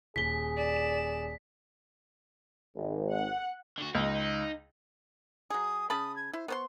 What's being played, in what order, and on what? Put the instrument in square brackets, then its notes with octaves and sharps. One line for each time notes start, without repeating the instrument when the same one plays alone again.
[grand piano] D#1 G7 [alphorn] G#4 [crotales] B6
[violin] D5 E7
[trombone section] G#1
[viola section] F#5
[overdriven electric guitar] D3 F#4
[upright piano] C#2 [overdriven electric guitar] D#4
[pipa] F#3 G#4 [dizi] D#6
[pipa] C#3 A5 B5 [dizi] D#6
[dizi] G#6
[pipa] E4 [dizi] C5
[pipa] B3 C5 C6 [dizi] C#6